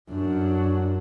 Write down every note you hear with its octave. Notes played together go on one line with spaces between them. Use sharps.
F#2 D4 F#4